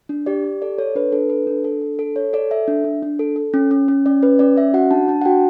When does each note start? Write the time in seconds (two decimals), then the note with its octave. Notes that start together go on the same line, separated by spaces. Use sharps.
0.09 D4
0.26 G4 D5
0.44 G4
0.62 A4 D5
0.78 A4 C#5
0.95 D4 B4
1.12 D4 A4
1.30 A4 B4
1.47 D4
1.64 A4
1.82 D4
1.99 A4
2.16 A4 C#5
2.33 A4 D5
2.51 A4 E5
2.68 D4
2.84 D4
3.03 D4
3.19 A4
3.36 A4
3.54 C#4
3.71 C#4
3.88 C#4
4.06 C#4 D5
4.22 C#4 B4
4.39 C#4 D5
4.57 C#4 E5
4.74 F#4 F#5
4.91 D4 A5
5.08 D4 A5
5.22 F#5
5.25 F#4 G5